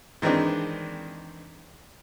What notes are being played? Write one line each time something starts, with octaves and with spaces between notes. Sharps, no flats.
D#3 E3 G#3 C4 D4